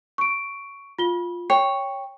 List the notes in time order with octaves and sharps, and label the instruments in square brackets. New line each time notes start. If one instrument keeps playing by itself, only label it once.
[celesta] C#6 D7
F4 G7
[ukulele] C#5 [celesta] G5